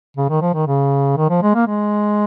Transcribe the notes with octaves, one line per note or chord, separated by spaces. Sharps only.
C#3
D#3
F3
D#3
C#3
D#3
F3
G#3
A#3
G#3